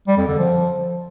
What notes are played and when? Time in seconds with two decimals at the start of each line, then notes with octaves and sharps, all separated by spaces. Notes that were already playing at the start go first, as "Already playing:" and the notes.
0.07 G3
0.18 F2
0.28 D3
0.38 F3